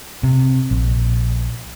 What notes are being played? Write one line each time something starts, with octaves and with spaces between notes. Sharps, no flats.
C3
A#1